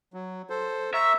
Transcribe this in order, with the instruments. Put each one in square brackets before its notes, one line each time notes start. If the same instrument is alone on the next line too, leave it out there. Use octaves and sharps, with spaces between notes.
[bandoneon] F#3
A4 C5
[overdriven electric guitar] E5 [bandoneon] A#5 C#6